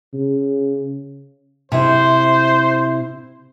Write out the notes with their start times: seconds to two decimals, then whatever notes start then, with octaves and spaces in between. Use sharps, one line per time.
0.14 C#3
1.72 C3 E4 C5